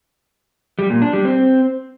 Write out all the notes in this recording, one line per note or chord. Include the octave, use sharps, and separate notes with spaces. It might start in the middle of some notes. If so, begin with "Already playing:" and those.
G3
A#2
D4
G3
C4